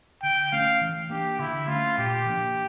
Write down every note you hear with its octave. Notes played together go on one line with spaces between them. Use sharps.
D3 G5
A3 C#4 F5
E3
A#3 D4 G4
D3 E4
A3 C#4 F4
A#2 G4
F3 A#3 D4